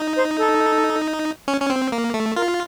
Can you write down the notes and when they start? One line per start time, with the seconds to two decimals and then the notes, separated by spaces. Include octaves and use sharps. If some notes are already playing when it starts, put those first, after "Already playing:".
Already playing: D#4
0.16 C5
0.37 A4
1.48 C#4
1.61 C#4
1.70 C4
1.92 A#3
2.14 A3
2.36 F4 A#4